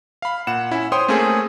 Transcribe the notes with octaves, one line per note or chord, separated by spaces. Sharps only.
F5 B5
A#2 F#5 E7
C#4 E4
C5 C#5 G5 C6 D#6
A3 A#3 C4 C#4 G#4